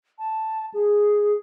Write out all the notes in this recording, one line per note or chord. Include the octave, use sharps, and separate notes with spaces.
A5
G#4